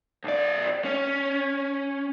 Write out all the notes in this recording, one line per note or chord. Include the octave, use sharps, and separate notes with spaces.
B1 D5
C#4